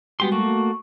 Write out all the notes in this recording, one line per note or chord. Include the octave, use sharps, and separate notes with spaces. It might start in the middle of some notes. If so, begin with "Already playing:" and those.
G3 G#3 B3 F#4 G4 C6
A3 A#3 F#4 C#6